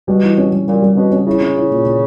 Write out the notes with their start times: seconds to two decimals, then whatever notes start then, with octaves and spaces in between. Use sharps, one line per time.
0.08 B2 G3
0.23 E3
0.38 C#4
0.52 G3
0.67 A#2 G3
0.82 G3
0.97 B2 C#4
1.12 C#4
1.27 C#3 E4
1.41 C#4
1.56 E4
1.71 A#2
1.85 A#2